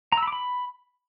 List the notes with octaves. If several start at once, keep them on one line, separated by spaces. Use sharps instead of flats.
A#5
E6
B5
D6
B5